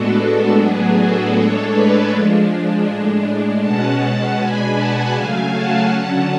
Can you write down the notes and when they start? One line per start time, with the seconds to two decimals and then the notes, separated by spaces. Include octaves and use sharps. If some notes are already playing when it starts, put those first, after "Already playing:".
Already playing: A2 G#3 B3 D4 F#4 A4
0.19 F#4 A4
0.57 A2 F#3 B3 D4 G#4
0.95 F#4 A4
1.34 A2 G#3 D4 A4 C#5
1.71 B4 D5
2.10 F3 G#3 D4
2.86 A2 G#3 D4
3.62 B2 G#3 C#4 F#5 A5
4.38 B2 G#3 D4 G#5 B5
4.76 F#5 A5
5.13 C#3 F#3 A3 F5 G#5
5.52 F#5 A5
5.90 D3 F#3 C#4 F#5 A5